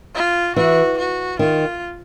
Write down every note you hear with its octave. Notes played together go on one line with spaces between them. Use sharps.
F4
E3 F#4
F#4
D#3 F4